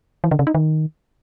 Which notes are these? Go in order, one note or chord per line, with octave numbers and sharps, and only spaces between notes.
E3
D3
C#3
D#4
D#3